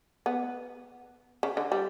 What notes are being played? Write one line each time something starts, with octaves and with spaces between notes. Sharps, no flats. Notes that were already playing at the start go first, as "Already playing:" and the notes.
B3
C#3
D3
G3